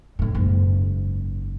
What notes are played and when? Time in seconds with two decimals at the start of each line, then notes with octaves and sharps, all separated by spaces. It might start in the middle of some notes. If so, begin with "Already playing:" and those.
0.19 A1 A2
0.35 F#1 G#2